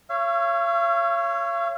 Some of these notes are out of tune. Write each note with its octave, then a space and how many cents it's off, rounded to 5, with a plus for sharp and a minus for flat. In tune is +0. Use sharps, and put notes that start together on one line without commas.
C#5 +0 F5 -40 E6 +40